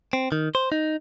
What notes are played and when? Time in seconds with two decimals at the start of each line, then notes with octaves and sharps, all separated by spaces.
0.13 C4
0.32 D#3
0.55 C5
0.72 D#4